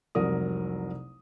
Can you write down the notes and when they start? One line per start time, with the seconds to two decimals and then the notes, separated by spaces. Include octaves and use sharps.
0.15 F1 C2 F#3 A#4 D#6